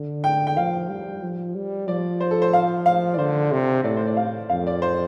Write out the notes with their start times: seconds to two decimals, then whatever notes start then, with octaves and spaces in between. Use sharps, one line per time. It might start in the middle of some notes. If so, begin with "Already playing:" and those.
Already playing: D3
0.24 G5
0.47 G5
0.56 F3 F5
0.89 G3
1.22 F3
1.55 G3
1.88 F3 D5
2.21 C5
2.31 A4
2.42 C5
2.53 F5
2.86 F5
3.14 D5
3.19 D3 C5
3.52 C3 C5
3.75 C5
3.84 A2 D5
3.97 C5
4.07 D5
4.17 F5
4.50 F2 F5
4.67 D5
4.82 C5